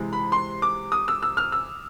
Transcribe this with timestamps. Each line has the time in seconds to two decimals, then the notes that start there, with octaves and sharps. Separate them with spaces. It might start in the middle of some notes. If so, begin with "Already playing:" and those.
Already playing: C3 E3 G#3
0.13 B5
0.32 C6
0.62 D6
0.92 D#6
1.08 E6
1.23 E6
1.37 F6
1.52 E6